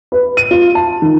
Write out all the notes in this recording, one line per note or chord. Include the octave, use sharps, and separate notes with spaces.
B4
D#7
F4
A5
D#3